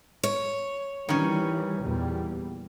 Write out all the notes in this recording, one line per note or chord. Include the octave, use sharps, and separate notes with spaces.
C#5
D#3 E3 G3 C#4
E2 A#2 G3